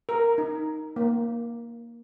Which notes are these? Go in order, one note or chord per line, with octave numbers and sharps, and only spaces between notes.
A#4
D#4
A#3